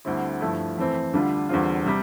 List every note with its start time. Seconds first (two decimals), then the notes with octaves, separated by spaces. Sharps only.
0.05 D2 D3 G3 C4 E4
0.41 G2 F3 A3 E4
0.77 F2 E3 A3 C4
1.13 D2 D3 G3 D4 F4
1.49 E2 D3 G3 C4 F4
1.86 C3 G3